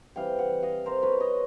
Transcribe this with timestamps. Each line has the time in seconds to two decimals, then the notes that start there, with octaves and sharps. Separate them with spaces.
0.16 C3 E3 G3 F5 G5
0.39 E5 F#5
0.63 D#5 F5
0.86 A#4 C5
1.03 B4 C#5
1.20 C#5 D#5